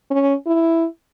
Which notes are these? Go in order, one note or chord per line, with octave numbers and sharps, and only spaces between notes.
C#4
E4